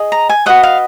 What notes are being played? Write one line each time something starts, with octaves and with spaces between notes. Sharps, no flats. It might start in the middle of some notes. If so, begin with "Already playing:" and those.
Already playing: G#4 D#5
A#5
G#5
F#4 B4 D#5 F#5
F5